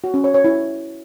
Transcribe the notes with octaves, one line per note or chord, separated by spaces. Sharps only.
F#4
C#4
C#5
C#5
E4